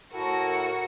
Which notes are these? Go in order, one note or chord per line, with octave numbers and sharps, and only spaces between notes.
A2 E4 F#4 A4 A#4